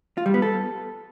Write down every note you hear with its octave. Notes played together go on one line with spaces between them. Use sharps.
F4
G3
B3
A4